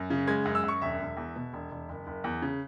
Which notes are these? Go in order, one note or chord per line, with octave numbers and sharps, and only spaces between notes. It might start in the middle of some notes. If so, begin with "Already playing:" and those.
Already playing: F#2
C#3
G#3 G#6
F#2
E6
F#2 C#6
E1 E5
E1
E2
B2
E1
E1
F#1
F#1
E2
C#3